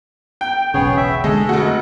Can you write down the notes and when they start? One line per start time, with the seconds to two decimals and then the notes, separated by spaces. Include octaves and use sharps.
0.41 G5
0.74 E1 B1 C#3 B3 G#4 C#5
0.97 E5
1.24 D3 G#3 A4 D#5
1.49 F1 A3 F#4